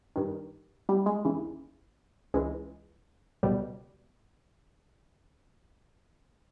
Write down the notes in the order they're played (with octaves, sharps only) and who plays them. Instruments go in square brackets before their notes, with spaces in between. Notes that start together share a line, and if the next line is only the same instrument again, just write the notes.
[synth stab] G2 D#3
G3
G#3
D#2 C#3 E3
C#2 C#3 E3 G#3
C#2 B2 G3